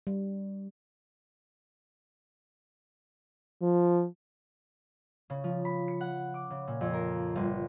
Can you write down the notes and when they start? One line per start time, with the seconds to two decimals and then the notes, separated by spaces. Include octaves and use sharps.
0.07 G3
3.62 F3
5.30 C#3
5.44 F3
5.65 B5
5.88 C#7
6.01 F#5
6.34 D6
6.50 C#3
6.67 A#2
6.81 F2
6.93 A#4
7.35 G1